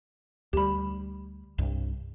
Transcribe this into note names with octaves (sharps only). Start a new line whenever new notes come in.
D2 G3 G4 B5
C2 G2